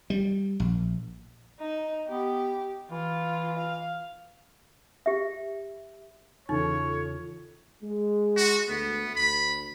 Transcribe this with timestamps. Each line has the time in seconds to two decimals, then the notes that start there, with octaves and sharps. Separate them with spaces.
0.10 G3
0.60 A#1
1.60 D#4
2.08 B3 G4
2.91 E3 F4
3.59 F5
5.06 G4 E5
6.49 E2 C#3 E3 D#4 F4 A4 C#5
7.83 G#3
8.37 F#4
8.69 D2 A3 B3
9.16 D2 B5